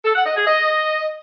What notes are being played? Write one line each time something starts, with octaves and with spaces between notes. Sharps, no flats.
A4
F#5
D#5
G#4
D#5